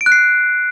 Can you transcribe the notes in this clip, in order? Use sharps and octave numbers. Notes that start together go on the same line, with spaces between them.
D7
F#6
C7